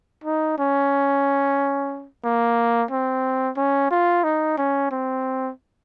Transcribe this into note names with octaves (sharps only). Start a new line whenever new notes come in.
D#4
C#4
A#3
C4
C#4
F4
D#4
C#4
C4